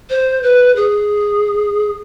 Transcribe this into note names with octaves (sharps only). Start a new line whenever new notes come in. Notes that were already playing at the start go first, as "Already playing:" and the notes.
C5
B4
G#4